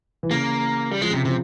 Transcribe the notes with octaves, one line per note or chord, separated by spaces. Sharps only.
E3
C#3 A#3
G3
F3 G#3
C#3
C3
C3 F3